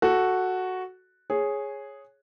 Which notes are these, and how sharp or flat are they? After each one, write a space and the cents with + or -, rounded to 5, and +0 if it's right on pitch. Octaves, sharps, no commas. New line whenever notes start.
F#4 +0 A4 +0
G#4 +0 C#5 -10